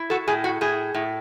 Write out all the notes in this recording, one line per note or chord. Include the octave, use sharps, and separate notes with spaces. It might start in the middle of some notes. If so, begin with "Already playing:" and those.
Already playing: E4
F#4 A4
A2 G#4
F#4
A2 G#4
A2